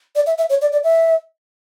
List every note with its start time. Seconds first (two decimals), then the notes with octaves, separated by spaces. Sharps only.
0.15 D5
0.26 E5
0.38 E5
0.50 C#5
0.62 D5
0.72 D5
0.84 E5